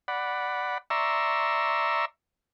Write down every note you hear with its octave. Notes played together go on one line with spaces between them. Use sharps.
D5 F#5 B5
D5 E5 A#5 C6 C#6 E6